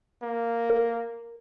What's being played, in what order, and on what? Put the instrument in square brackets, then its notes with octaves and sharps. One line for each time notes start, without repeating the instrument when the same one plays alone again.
[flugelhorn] A#3
[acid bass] A#4